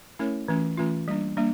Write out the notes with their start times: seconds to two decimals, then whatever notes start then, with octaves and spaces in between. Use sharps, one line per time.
0.19 A3 C#4 E4 A#4 C#5
0.48 E3 A3 C#4 F4
0.77 E3 A3 C#4 F4
1.08 G3 A#3 D4
1.37 G3 A#3 D4